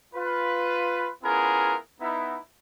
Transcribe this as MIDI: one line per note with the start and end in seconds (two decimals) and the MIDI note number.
0.14 1.09 65
0.14 1.09 71
1.23 1.74 59
1.23 1.74 61
1.23 1.74 64
1.23 1.74 65
1.23 1.74 68
1.23 1.74 70
2.00 2.36 59
2.00 2.36 63
2.00 2.36 64